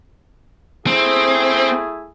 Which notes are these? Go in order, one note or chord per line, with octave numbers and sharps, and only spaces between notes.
A3 C4 E4 G#4